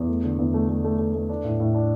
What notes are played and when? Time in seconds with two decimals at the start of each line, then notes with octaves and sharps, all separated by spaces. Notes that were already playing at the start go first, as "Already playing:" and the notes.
Already playing: E2
0.09 A3
0.24 D3
0.39 E2
0.54 A3
0.69 A3
0.84 A3
0.98 A3
1.14 A3
1.29 D4
1.44 A2
1.60 A2
1.75 D4